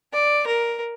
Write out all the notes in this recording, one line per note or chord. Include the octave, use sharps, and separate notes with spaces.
D5
A#4